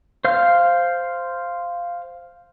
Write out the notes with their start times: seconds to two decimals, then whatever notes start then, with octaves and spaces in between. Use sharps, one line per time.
0.25 C5 F5 F6